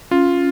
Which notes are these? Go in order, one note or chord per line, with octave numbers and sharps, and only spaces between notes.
C#4 F4